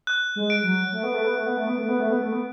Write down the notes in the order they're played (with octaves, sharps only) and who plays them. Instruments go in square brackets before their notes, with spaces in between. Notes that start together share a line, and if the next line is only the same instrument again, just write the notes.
[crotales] F#6
[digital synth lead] G#3
[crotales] D7
[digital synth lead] F#3
A3
B3
A3
B3
A3
B3
A3
B3
A3
B3
A3
B3
A3
B3